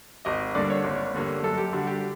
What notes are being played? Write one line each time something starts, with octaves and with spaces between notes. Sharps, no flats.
G#1 D#5
G2 D3 G3 A#3 D5
C#5
G#1
G2 D3 G3 A#3
F#2 A4
G4
D3 G3 F#4
G4